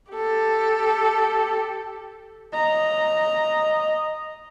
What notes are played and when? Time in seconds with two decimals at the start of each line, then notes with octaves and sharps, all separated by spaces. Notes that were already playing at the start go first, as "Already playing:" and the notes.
0.12 G4 A4
2.53 D#5 A#5